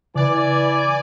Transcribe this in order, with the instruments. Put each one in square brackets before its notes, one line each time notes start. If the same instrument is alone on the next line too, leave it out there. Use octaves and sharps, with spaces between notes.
[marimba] C#3 [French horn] E3 [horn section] D5 G#5